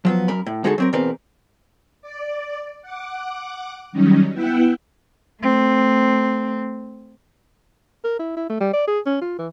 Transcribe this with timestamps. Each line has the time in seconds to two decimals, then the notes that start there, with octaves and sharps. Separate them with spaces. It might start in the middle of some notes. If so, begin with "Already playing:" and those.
0.05 F3 F#3 B3
0.28 F#2 A#4 B5
0.46 A2
0.64 D3 G#3 D#4 F#4 G#4 A4
0.78 F#3 C4 A#4
0.93 E2 B2 C4 A#4 B4
2.02 D5
2.82 F#5 D6
3.92 D#3 F#3 G3 C#4 D#4
4.33 B3 E4 E5 F#5 G5
5.41 A3 C4
8.04 A#4
8.19 E4
8.36 E4
8.49 A3
8.60 G3
8.73 D5
8.87 G#4
9.06 C#4
9.21 F4
9.38 E3